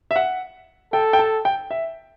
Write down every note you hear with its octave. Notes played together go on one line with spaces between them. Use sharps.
E5
F#5
A4 G5
G5
A5
G5
E5